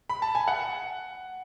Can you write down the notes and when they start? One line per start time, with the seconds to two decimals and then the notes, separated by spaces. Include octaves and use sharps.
0.09 B5
0.22 A5
0.35 G#5
0.48 F#5